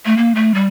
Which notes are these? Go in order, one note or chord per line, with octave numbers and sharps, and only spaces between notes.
A3
A#3
A3
G3